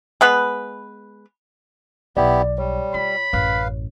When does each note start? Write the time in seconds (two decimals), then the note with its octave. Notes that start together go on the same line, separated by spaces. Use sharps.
0.21 G#3 B3 B4
2.17 B1 B3 E4 G4 D5
2.58 G3 C#5
2.94 F4 B5
3.33 A1 F#2 B4 F5